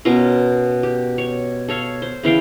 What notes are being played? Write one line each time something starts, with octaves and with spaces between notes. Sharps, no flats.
B2 C#4 F4 A#4
G4
C#5
A4 C#5 F5
C5
C#3 E3 F5 G5